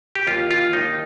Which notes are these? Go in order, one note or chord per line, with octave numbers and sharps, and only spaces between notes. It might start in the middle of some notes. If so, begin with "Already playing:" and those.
G4
D#2 F4
F4
D#2 D#4